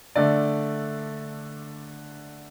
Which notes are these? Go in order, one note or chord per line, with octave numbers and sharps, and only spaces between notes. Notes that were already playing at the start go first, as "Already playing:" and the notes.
D3 A3 D5